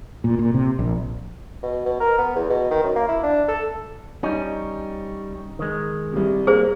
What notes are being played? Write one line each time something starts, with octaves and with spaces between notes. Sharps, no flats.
A#2
A#2
C3
A#1
B2
B2
A#4
B3
E2
B2
D#3
F#2
A#3
E4
D4
A4
G3 C#4 D#4
D#3 G#3
C2 C3
A#3 G#4 C5